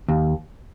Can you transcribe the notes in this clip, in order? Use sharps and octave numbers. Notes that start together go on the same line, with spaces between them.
D#2